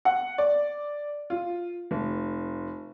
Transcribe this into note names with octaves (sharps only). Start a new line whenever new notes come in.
F#5
D5
F4
F1